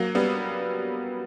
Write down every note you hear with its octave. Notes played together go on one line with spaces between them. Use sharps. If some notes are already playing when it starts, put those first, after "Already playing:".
Already playing: F#3 A#3
G3 B3